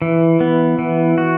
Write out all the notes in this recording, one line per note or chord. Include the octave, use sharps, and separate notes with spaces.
E3
B3
E3
F#4